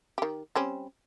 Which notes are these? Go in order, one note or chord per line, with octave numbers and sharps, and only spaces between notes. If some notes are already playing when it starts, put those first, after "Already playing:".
D#3 G4
G3 C4 C#4